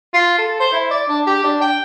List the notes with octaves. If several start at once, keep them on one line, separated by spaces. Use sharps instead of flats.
F4
A4
C5
E4
D5
D4
G4
D4
G5